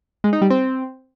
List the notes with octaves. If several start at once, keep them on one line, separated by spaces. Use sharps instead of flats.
G#3
D#4
G3
C4